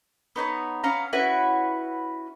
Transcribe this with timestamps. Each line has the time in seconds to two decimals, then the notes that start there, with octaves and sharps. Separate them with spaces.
0.36 B3 D#4 C5 C#5
0.84 B3 C#4 F5 A#5
1.13 C#4 E4 F#4 B4